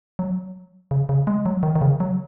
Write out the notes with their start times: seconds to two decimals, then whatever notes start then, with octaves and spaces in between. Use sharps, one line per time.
0.19 F#3
0.91 C#3
1.09 C#3
1.27 G#3
1.46 F#3
1.63 D#3
1.76 D#3
1.81 C#3
2.00 F#3